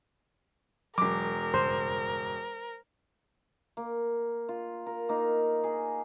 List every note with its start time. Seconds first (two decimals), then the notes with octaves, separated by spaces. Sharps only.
0.98 E1 F#3 A#4 D6
1.54 F#1 G2 C#3 C5
3.77 A#3
4.49 F4
4.86 A#4
5.09 A#3 D#4
5.64 G#4